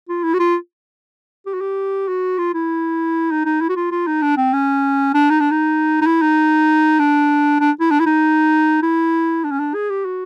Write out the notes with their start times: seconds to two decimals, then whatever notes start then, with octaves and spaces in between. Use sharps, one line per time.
0.09 F4
0.23 E4
0.34 F#4
0.40 F4
1.46 G4
1.54 F#4
1.61 G4
2.08 F#4
2.39 F4
2.54 E4
3.31 D#4
3.45 D#4
3.61 E4
3.69 F#4
3.76 F4
3.92 F4
4.07 D#4
4.22 D4
4.37 C4
4.54 C#4
5.14 D4
5.30 D#4
5.40 D4
5.51 D#4
6.02 D#4
6.06 E4
6.22 D#4
6.99 D4
7.61 D4
7.80 E4
7.91 D4
8.00 E4
8.06 D#4
8.83 E4
9.44 D4
9.51 C#4
9.60 D4
9.74 G#4
9.90 G4
10.05 F#4